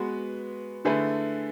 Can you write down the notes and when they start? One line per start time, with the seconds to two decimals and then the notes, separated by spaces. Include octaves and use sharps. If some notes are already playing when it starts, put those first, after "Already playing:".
Already playing: G#3 B3 F#4 B4
0.85 D3 A3 E4 G#4 B4